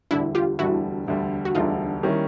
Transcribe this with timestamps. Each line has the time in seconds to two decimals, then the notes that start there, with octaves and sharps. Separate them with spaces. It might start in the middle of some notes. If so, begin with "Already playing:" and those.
0.11 E1 D2 D3 G3 D4 E4
0.35 F4 G4
0.59 E1 D2 D3 G3 E4 F#4
1.06 E1 D2 D3 G3
1.45 F#4
1.55 E1 D2 D3 G3 D#4 F4
2.03 D#3 G3 A#3 C#4 E4